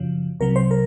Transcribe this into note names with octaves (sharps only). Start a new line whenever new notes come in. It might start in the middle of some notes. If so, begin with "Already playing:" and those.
Already playing: F#2 C#3 F3
C2 C3 F#3 A#4
C5
A#4